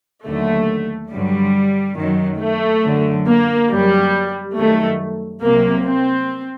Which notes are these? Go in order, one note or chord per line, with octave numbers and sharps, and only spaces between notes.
D#2 D3 F#3 A3
G2 D3 F#3 G3
F#2 D#3 F#3
A3
F#2 D3 F#3
A#3
F#2 F#3 G3
F#2 D#3 F#3 A3
C2 C3 F#3 A#3
C4